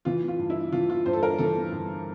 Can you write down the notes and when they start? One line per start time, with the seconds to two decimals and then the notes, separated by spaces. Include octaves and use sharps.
0.05 E3 F4
0.28 F4
0.39 G2
0.50 E4
0.72 E3 F4
0.89 F4
1.06 G2 C5
1.13 A4
1.23 A#4
1.38 E3 A4
1.72 G2